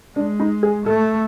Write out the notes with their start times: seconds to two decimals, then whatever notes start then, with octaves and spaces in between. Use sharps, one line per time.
0.16 G#3 D4
0.40 D#4
0.63 G#4
0.85 A3 A4